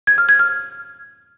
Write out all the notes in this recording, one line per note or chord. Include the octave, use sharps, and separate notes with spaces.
G#6
F6
G#6
F6